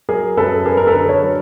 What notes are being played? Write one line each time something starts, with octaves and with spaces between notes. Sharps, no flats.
F#3 G#4 A#4
F#2 A4 B4
F#2 G#4 A#4
A#4
A4 B4
D3
B4 C#5
F#3